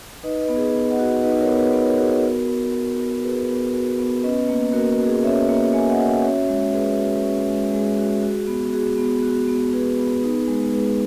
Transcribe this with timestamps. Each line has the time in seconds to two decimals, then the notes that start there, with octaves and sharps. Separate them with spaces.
0.23 D#4 B4 D#5
0.40 B4 D#5
0.48 B3
0.56 G#4
0.73 B3
0.91 D#5 F#5
0.99 F#4
1.23 D#4 B4 D#5
1.40 A#4 C#5
1.49 B3
1.57 G#4 B4
1.73 B3
1.86 A#4 C#5
1.98 F#4 G#4 B4
2.11 F#4 A#4
2.24 F#4
2.48 B3
2.74 F#4
2.98 B3
3.23 F#4 G#4 B4
3.49 B3
3.74 F#4
3.99 B3
4.23 C#4 B4 D#5
4.49 A#3
4.73 A#3 F#4 A#4
4.98 F#4
5.07 G#4
5.23 C#4 C#5 E5
5.48 A#3
5.73 A#3 E5 G#5
5.90 D#5 F#5
5.98 F#4
6.06 D#5 F#5
6.23 C#4 C#5 E5
6.48 G#3
6.73 G#3 G#4 B4
6.98 F#4
7.23 C#4
7.48 G#3
7.73 G#3 G#4
7.99 F#4
8.23 F#4
8.47 B3
8.73 F#4 G#4
8.98 B3
9.23 F#4
9.48 B3
9.73 F#4 G#4 B4
9.98 B3
10.23 D#4
10.48 G#3
10.73 G#3 G#4 B4